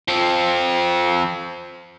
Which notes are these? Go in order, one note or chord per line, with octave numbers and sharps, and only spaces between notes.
F3 C4